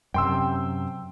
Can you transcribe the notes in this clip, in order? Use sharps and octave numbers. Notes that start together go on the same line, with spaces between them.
F#2 C3 G5 C6 E6